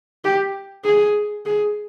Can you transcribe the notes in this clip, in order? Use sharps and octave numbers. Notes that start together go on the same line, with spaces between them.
G4
G#4
G#4